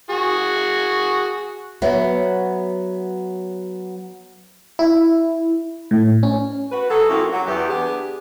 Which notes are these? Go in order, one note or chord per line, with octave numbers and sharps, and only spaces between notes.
F#4 G#4
F#3 B3 C#5 E5
E4
A2
C#4
F#4 B4
F#3 G#4 A4
F#2 C3 A#3 E4 F4
F#3
E2 G4
B3 D4 G4 G#4